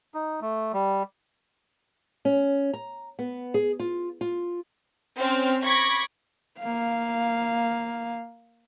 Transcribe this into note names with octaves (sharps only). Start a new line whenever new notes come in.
D#4
A3
G3
C#4
A#5
B3
G#4
F4
F4
C4 C#4 F6
B5 C#6 D6 G#6 A#6
A#3 F5